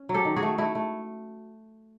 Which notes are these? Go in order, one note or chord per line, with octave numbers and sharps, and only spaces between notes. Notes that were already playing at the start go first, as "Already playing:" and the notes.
Already playing: C#4
F#3
G4 A4
D#3
F#4 G#4
A3
A3 E4 F#4
A3